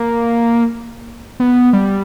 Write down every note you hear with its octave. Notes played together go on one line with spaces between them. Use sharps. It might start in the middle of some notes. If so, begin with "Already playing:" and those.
Already playing: A#3
B3
G3